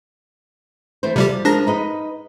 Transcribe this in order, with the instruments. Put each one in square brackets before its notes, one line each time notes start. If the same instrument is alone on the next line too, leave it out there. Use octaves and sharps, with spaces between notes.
[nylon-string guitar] E3 A3 C5
[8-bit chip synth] C3 G3 G4 [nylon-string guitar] F3
[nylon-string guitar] F3 G#3 A#4 [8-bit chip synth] D4 A#6
[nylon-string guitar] D#4 B4 D#5